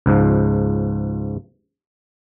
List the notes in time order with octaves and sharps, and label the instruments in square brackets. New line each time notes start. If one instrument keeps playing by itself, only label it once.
[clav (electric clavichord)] C#2 G#2 F3